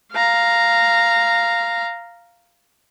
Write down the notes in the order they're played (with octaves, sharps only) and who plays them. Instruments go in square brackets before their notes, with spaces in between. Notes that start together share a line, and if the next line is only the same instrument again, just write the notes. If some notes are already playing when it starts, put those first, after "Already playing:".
[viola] F5 A#5